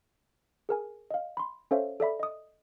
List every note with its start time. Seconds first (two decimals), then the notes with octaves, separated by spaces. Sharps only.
0.69 G#4 A#4 G#5
1.11 D#5 F5
1.37 B5 C6
1.71 C#4 A4 C5 C#5 E5 F5
2.00 A4 D5 E5 B5
2.20 D#5 D#6